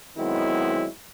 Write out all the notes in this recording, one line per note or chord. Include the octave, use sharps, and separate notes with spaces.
D#3 F#3 G#3 B3 C4 E4